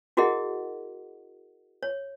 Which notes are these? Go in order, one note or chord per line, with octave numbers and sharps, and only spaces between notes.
E4 F#4 G#4 A#4 D#5 F#5
C#5